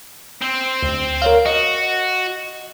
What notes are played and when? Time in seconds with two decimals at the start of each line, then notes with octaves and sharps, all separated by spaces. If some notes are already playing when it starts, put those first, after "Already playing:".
0.42 C4 C5
0.83 D2
1.22 A#4 C#5 F5
1.46 F#4 D#5